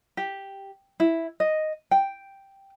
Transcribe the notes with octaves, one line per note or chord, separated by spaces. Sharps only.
G4
E4
D#5
G5